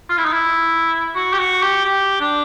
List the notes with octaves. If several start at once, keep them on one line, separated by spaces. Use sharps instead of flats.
F4
E4
D#4
E4
F#4
G4
F#4
G4
G4
D4